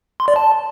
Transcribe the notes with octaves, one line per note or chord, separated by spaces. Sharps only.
C6
D5
A5